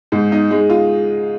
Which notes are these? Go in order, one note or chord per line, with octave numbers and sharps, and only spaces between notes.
G#2
D#4
G#3
F4